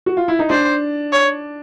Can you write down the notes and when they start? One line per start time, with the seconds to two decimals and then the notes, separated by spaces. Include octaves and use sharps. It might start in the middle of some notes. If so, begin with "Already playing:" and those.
0.06 F#4
0.17 F4
0.28 E4
0.39 D#4
0.50 D4 C5
1.12 C#5